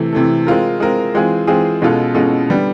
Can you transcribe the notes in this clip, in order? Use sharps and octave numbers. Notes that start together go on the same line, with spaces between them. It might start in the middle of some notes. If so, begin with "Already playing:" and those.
Already playing: C3 E3 A3
C3 E3 A3
G#3 C4 F4 A#4
G#3 C4 F4 A#4
E3 G#3 C4 F4 G#4
E3 G#3 C4 F4 G#4
B2 G#3 C#4 F4 A4
B2 G#3 C#4 F4 A4
D3 G3 B3